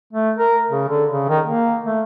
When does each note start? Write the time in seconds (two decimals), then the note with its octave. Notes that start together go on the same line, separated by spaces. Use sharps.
0.13 A3
0.37 A#4
0.70 C#3
0.88 D3
1.11 C#3
1.28 D#3
1.45 A#3
1.84 A3